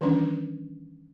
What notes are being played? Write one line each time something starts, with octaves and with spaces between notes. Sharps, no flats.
D#3 E3 G3 C#4 D4